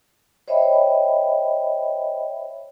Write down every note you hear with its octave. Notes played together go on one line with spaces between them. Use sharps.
C5 C#5 D#5 E5 G5 B5